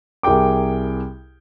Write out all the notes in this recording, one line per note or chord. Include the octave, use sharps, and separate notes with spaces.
C2 G#4 A#4 G5 D6